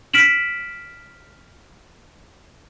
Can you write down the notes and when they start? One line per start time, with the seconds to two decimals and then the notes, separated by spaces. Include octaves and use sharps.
0.13 F6 B6 D7 E7 F#7